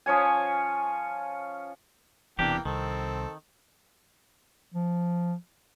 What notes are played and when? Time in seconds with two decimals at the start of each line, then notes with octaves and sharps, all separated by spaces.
0.06 F3 C#4 C#5 G#5
2.39 E1 E2 C3 E3 A#3 D4 G4 G5
2.65 C2 D#3 C4 A4
4.74 F3